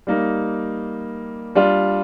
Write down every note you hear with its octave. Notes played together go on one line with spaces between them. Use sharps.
G3 A#3 D#4
G3 D4 F4